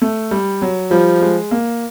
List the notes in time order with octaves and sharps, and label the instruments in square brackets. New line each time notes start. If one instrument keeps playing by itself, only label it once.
[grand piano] A3
G3
F#3
[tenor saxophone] F3 [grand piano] G3
[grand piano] G#3
A#3